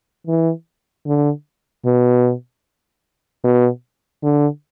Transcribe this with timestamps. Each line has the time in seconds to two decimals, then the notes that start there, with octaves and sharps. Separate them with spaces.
0.27 E3
1.06 D3
1.85 B2
3.44 B2
4.23 D3